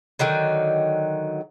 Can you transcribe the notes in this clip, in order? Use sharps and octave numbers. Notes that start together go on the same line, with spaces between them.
D3 D#3 F#3 D#4